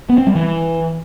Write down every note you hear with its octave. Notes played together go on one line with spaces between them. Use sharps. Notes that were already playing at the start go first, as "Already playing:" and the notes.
B3
C4
G3
E3